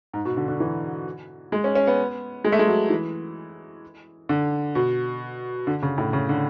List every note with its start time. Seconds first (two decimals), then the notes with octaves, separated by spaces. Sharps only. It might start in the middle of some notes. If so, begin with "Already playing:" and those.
0.13 G#2
0.25 B2
0.37 D3
0.48 D3
0.60 E3
1.52 G#3
1.64 C#4
1.75 C#4
1.87 B3
2.44 G#3
2.52 A3
2.59 G#3
2.67 F#3
2.90 E3
4.29 D3
4.75 B2
5.67 D3
5.82 C#3
5.98 A2
6.13 C#3
6.29 D3